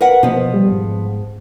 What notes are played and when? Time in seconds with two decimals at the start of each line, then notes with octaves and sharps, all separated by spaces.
0.01 A#4 B4 F#5
0.23 B2 F3 B3
0.53 G3
0.71 G#2